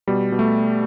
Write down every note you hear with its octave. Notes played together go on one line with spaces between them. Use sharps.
B2 G3
B2
A3